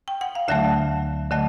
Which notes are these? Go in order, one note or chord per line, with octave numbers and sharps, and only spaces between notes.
G5
F#5
F5
D2 D3 F#3 A3 E5
D3 F#3 A3 D#5